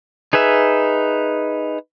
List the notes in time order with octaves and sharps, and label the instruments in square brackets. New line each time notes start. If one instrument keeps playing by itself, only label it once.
[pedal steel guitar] D#4 G#4 B4 E5